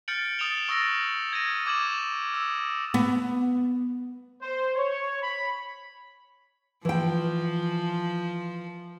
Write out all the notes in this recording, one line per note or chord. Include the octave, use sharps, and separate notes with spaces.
F6 G6 A6 C#7 D7 F#7
D#6 A6 D7 E7 F7 G7
C#6 D#6 E6 A6 A#6 D7
G#6 A#6 D#7
D6 D#6 G#6 E7 F#7
E6
B3
C5
C#5
B5
E3 F3 G5